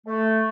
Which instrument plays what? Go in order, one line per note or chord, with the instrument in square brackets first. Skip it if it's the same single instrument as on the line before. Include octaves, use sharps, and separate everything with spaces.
[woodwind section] A3